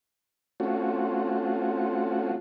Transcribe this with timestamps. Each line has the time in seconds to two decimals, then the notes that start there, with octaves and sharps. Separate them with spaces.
0.60 A3 C4 C#4 F4 F#4